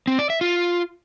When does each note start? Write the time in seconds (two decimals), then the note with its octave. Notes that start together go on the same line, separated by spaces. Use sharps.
0.07 C4
0.19 D5
0.30 E5
0.41 F4